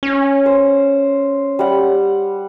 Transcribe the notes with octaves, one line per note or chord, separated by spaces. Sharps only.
C#4
C5
G3 F#5